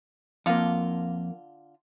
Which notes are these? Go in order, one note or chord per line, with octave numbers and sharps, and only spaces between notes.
F2 D3 A#3 F4